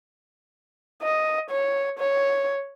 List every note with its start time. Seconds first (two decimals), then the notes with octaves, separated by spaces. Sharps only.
1.02 D#5
1.50 C#5
1.99 C#5